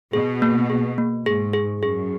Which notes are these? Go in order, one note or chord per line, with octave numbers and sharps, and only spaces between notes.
B2 G#4
A#3
G#4
A#3
G#2 G#4
G#4
F#2 G#4